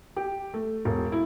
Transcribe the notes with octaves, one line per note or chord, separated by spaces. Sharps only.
G4
A3
E1
E4